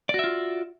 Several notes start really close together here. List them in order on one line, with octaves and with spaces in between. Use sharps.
D5 F#4 E5 F4